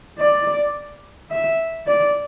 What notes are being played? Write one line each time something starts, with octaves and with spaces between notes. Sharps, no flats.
D5
E5
D5